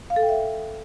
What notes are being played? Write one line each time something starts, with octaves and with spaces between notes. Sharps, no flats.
F5
A4
G5
E5